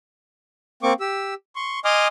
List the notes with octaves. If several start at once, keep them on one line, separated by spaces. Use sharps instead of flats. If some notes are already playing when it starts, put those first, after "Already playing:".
A#3 C4 C#6 D6
G4 E6
C6 C#6
D#5 G#5 C6 D6 D#6 F6